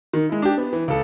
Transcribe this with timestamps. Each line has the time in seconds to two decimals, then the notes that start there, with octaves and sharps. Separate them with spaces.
0.13 D#3
0.29 G#3 E4
0.42 D4 G4
0.58 B3
0.73 E3
0.88 C#2 A4